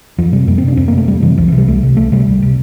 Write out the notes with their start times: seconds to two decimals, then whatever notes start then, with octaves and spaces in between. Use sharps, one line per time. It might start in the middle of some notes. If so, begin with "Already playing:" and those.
0.18 F2 F3
0.32 C3 G3
0.47 F2 A#3
0.58 C4
0.63 C3 D4
0.77 F2 C4
0.88 A#3
0.92 C3
0.98 A3
1.08 F2 G3
1.22 C3 E3
1.38 C2 F3
1.48 E3
1.52 C3
1.58 G3
1.68 C2 A3
1.83 C3
1.97 C2 A3
2.12 C3 G3
2.27 C2
2.42 C3